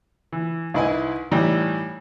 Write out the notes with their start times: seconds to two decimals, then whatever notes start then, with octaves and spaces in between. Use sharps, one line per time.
0.33 E3
0.74 C2 D#4 E4 B4 D#5 G#5
1.31 A2 E3 G3 D#4 G5 A#5